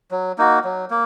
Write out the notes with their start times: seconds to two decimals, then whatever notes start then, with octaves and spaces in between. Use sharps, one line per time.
0.11 F#3
0.38 A#3 D#4 F#4
0.64 F#3
0.91 A#3